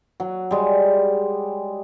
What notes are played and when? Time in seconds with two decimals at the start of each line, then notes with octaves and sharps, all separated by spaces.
0.20 F#3
0.51 G3 G#3